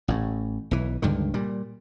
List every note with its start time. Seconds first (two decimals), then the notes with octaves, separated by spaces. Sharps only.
0.08 A1 A2
0.71 B1 E3
1.02 C#2 G2 D3 D#3
1.34 A#2 G3